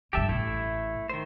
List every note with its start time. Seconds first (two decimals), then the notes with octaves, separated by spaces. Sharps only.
0.13 G2 G#3 G4 A4 E5
0.29 A1 A2 A3 E4
1.09 D#3 C5